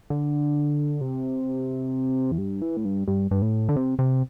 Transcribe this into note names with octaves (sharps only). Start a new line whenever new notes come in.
D3
C3
E2
G2
E3
A2
G2
G2
G2
A2
D3
C3
C3